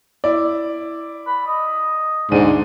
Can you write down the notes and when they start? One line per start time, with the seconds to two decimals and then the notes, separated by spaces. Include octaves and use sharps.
0.24 E4 D5
1.27 B5
1.47 D#5
2.31 D2 G#2 D4 D#7